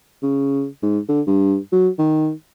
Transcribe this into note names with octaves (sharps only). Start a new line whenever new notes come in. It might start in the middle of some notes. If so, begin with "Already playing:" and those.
C#3
G#2
D3
G2
F#3
D#3